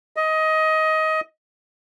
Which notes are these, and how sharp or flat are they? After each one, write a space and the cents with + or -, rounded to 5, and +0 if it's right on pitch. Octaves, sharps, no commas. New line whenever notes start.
D#5 +20